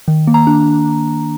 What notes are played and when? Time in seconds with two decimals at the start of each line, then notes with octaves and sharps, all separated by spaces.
0.08 D#3
0.27 A#3
0.34 A#5
0.47 D4